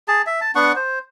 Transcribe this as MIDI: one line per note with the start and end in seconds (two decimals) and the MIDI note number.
0.08 0.22 68
0.08 0.22 81
0.27 0.40 76
0.41 0.52 81
0.55 0.73 59
0.55 0.73 62
0.55 0.73 78
0.55 0.73 85
0.76 0.99 72